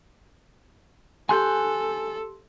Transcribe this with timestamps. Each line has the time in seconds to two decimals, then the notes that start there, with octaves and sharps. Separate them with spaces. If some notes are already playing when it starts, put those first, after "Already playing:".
1.29 G4 A4 G#5 C6 F#6 G6